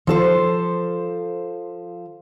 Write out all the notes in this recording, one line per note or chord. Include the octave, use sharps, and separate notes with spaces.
F3 A4 C5